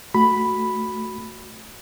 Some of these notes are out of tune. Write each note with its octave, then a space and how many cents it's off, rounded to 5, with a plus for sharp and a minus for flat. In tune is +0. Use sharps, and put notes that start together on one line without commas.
A3 +0 F#4 +0 B5 +0